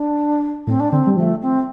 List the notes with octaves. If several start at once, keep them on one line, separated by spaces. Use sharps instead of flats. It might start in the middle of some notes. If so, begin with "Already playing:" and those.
Already playing: D4
A2 C4
D4
D3 C4
G3
F3 A3
C4